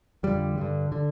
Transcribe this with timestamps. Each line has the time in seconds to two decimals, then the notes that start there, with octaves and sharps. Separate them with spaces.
0.23 F2 D3 G3
0.58 G2 D3
0.92 D3